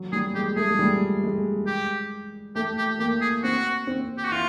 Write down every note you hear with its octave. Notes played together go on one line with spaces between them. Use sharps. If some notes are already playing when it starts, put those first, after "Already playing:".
Already playing: F#3
G3 G#4
G#3 G4
A3 G#4
G#3
G3
G#3
G4
A3 G4
G4
A#3 G4
G#4
C4 F#4
C4
G4
F#4
E4 F4